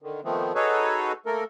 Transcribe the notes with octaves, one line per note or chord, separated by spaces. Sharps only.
D3 D#3
D#3 F3 A3 B3 C4
D#4 F#4 G#4 A4 B4 C#5
A3 A#3 A4 A#4